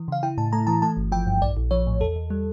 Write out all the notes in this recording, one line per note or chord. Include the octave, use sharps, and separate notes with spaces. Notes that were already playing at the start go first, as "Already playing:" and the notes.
Already playing: E3
C#3 F5
E4 G5
A2 A5
A3 A#5
E3 A5
A3 A5
G1
F3 G5
G2
A#1 D5
A#1
F3 C#5
A2
E2 A4
E2
G3